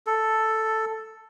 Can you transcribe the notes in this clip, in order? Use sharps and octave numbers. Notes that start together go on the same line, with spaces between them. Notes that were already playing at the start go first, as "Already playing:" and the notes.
A4